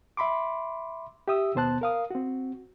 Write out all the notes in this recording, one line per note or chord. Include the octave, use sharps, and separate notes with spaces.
E5 B5 C6 D6
G4 E5 D#6 E6
D#2 B2 B3 C5 A5 F#6
A#4 F5 D#6
C4 F#4